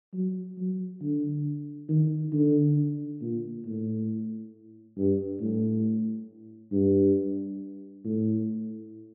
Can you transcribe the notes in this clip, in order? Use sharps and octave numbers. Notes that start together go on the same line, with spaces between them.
F#3
F#3
D3
D#3
D3
A#2
A2
G2
A2
G2
A2